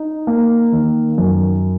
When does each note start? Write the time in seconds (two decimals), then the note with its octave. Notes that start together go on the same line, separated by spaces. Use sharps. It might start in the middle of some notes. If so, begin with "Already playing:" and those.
Already playing: D#4
0.27 A#3
0.72 D#3
1.18 F#2